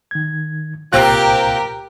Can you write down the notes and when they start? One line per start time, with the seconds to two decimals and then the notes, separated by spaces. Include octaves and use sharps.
0.11 D#3 G#6
0.93 C2 A#2 C4 F4 G4 A#4 F#6